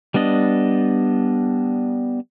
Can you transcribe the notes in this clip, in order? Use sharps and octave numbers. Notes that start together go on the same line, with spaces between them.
G3 B3 D4 D#5